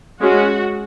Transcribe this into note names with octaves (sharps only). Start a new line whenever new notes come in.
G#3 C#4 F#4